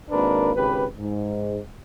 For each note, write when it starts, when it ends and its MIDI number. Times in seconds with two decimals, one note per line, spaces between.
0.10 0.51 32
0.10 0.51 58
0.10 0.51 62
0.10 0.51 70
0.10 0.51 71
0.55 0.84 32
0.55 0.84 49
0.55 0.84 67
0.55 0.84 71
0.97 1.58 44